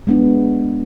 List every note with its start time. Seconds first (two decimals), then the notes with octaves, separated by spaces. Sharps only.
0.07 G#3 B3 D4